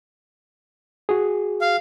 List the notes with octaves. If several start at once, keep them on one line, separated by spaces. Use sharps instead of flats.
F#4 G#4
F5